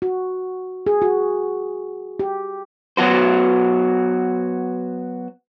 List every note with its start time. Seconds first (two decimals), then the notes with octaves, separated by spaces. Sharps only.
0.02 F#4
0.87 G#4
1.02 F#4
2.19 G4
2.97 F#3 B3 F#4 C5